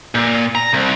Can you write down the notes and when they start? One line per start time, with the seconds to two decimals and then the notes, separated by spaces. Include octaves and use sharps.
0.15 A#2
0.55 A#5
0.73 C2